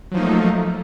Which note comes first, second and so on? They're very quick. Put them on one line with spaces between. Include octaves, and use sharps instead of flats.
F#3 F3 D#4 A#3 A3